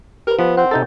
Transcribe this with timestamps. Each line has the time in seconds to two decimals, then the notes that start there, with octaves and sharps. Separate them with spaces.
0.27 G4 A#4 B4
0.39 F3 B3
0.57 C4 F#5
0.71 C3 D#4 A4 G6 A6